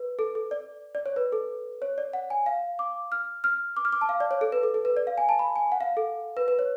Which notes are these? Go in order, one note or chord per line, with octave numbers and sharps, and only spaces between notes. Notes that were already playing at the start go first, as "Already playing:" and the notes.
Already playing: B4
A4
A4
D5
D5
C#5
B4
A4
C#5
D5
F#5
G#5
F5
D6
F6
F6
D6
F6
D6
A5
F5
D5
C#5
A4
B4
A4
A4
B4
D5
F5
G#5
A5
B5
G#5
F#5
F5
A4
B4
B4
C#5